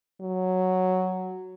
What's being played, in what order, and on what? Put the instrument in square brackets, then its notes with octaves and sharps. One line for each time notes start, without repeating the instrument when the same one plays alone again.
[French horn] F#3